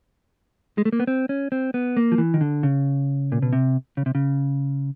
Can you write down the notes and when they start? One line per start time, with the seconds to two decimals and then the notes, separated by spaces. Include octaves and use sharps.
0.78 G#3
0.85 A3
0.93 A#3
1.00 B3
1.07 C4
1.29 C#4
1.52 C4
1.74 B3
1.97 A#3
2.12 F3
2.18 E3
2.34 D#3
2.41 D3
2.63 C#3
3.32 A#2
3.42 B2
3.53 C3
3.97 C#3
4.06 C3
4.15 C#3